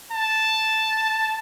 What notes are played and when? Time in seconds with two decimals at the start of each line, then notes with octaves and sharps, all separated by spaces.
0.12 A5